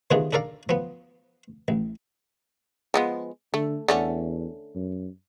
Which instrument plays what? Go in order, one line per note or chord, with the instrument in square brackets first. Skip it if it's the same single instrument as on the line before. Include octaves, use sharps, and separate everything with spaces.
[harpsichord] C3 D#3 B3 D4 F4 G#4
D4 A4 A#4 D5 F5
F3 B3
A1
[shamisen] F3 G#3 B3
[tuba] D3 [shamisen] A3
[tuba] E2 [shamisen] D3 A3 C#4
[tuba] F#2